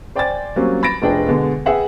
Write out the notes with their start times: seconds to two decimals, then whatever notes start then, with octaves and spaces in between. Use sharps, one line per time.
0.15 C5 D5 G5 G#5 D6 A6
0.56 F#3 G3 A#3 C4 C#4 C#5
0.83 B5 A6 A#6 D7
1.02 F1 F3 D4 G#4 B4 G5
1.27 B2 D3 G#3 B3
1.66 G#4 B4 E5 F#5 G5